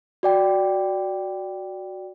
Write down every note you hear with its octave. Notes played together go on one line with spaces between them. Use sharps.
F#4 D5 G5